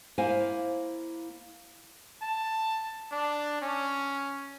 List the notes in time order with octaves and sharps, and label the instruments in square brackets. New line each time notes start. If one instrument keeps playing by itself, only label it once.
[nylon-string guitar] A#3 E4 C5 F5 G#5
[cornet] A5
D4
C#4